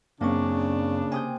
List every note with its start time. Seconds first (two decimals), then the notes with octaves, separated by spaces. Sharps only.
0.21 F#2 C#3 A#3 C4 D4 C#6
1.12 C3 G#5 D#6 G6